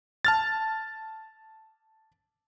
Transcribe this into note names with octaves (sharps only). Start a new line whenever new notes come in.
A5 F6 A6